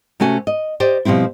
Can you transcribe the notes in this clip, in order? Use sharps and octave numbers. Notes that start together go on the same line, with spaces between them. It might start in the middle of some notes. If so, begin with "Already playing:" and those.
C3 A3 C#4 F#4 G#5
D#5
G4 C5 D5 D#5
B2 F3 G3 C4 E4